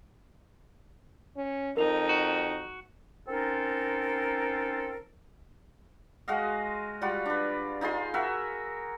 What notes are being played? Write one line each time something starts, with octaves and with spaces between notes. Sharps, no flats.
C#4
F2 D#4 A#4 F7
F#4
C4 C#4 D#4 F4 A4 A#4
G#3 F#4 D#5 F5
G3 F4 F#4
D4 B4
D#4 F4 G#4 C6
F#4 A#4 E5